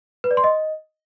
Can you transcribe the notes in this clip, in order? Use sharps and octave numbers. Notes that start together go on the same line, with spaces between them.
B4
D5
C6
D#5